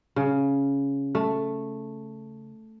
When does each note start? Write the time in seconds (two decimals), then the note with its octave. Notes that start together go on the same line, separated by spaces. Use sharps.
0.16 C#3
1.15 A3